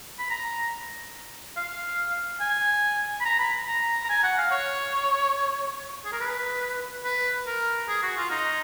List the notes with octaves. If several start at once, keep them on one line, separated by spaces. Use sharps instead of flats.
B5
A#5
F5
G#5
B5
A#5
B5
A#5
A#5
G#5
F#5
F5
C#5
G#4
A#4
B4
B4
A#4
G#4
F#4
F4
D#4